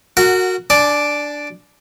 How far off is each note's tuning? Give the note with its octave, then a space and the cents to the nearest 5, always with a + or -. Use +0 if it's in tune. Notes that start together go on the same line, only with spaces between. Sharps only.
F#4 -10 A#4 -25 F#5 +5
D4 +0 D5 +0 G#5 +45